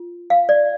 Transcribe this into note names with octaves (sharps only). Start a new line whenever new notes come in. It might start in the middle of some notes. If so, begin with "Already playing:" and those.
Already playing: F4
F5
D5